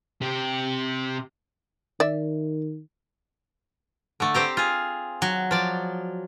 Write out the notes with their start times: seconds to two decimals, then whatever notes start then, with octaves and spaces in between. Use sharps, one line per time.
0.21 C3 G4
2.00 D#3 D5 E5
4.20 D3 A3
4.34 C4 G4 A#5
4.57 F4 G#4
5.22 F#3
5.51 F3 D5